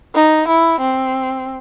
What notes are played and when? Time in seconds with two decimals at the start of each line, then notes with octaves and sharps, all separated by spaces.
0.15 D#4
0.48 E4
0.80 C4